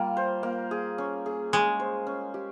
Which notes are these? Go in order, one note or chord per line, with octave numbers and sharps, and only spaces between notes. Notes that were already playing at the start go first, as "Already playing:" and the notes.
Already playing: G3 A#3 F4
C5
A#3
G#4
C#4
G#4
G#3 C#4
C5
C#4
G4